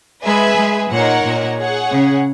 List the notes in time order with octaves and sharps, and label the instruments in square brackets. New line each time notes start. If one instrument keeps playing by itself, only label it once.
[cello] G#3 [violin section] G#4 B4 E5 G#5
[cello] G#3
[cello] A#2 [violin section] D#4 A#4 C#5 F#5
[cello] A#2
[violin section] G#4 C#5 F#5
[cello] C#3